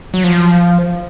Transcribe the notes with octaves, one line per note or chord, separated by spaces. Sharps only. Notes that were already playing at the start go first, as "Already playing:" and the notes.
F#3
F3